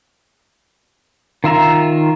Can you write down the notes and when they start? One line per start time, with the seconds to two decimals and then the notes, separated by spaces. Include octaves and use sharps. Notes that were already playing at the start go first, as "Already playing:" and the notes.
1.44 D#3 F4 E5 A#5